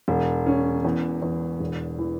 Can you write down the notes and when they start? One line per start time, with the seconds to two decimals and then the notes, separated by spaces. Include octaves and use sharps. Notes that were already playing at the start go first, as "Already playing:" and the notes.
0.08 E1
0.46 C#4
0.84 E2
1.22 E2
1.60 E1
1.99 E3